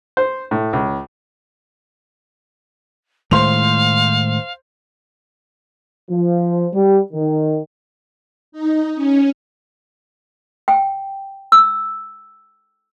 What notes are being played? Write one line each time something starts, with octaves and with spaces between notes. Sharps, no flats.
C5
A2
C#2
A2 D#3 G#3 C5 F5 C6 F7
F3
G3
D#3
D#4
C#4
G5
E6